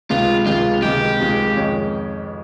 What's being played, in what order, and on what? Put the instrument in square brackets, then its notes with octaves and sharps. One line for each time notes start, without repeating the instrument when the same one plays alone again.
[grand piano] C#2 C3 D#3 G#3 [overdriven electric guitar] F4
[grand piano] C#2 C3 D#3 G#3 [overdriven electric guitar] F4
[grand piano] C#2 C3 D#3 G#3 [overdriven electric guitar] G4
[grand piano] C#2 C3 D#3 G#3
F2 D#3 G#3 C#4